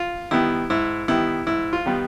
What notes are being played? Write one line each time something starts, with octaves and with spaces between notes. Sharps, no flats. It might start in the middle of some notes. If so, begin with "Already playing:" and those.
Already playing: F4
D#3 G3 B3 E4
G#2 E4
D#3 G3 B3 E4
G#2 E4
F4
D#3 G3 B3